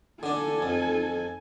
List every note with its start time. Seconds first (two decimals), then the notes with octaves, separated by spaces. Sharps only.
0.23 D3 D4 A4 G#5
0.62 F2